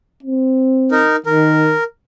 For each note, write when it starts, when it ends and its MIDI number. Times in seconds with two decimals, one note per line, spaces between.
0.23 1.05 60
0.91 1.16 63
0.91 1.16 70
1.26 1.75 51
1.26 1.84 70